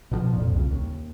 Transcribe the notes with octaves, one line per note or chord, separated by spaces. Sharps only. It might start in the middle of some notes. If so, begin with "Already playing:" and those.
B2 D3 F3
F2 A#2
C2 C#3
D#2